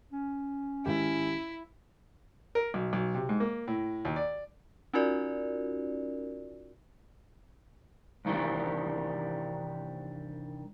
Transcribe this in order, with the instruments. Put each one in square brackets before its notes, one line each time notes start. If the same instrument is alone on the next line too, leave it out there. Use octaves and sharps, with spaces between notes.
[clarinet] C#4
[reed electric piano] G#2 D#3 G4 [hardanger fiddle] E4
[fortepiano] A#4
B1
B1
C3
G#2
A#3
A2
D#2
D5
[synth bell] C#4 D#4 F4 F#4 A#4 D5
[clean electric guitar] C2 G2 D#3 E3 G3